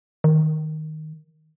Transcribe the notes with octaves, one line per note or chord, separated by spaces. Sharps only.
D#3